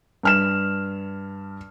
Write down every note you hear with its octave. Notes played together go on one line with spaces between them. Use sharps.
G2 F6 E7